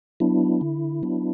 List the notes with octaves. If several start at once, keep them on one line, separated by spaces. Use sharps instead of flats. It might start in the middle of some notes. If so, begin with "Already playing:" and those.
F#3 B3 D4 E4
D3
F#3 B3 D4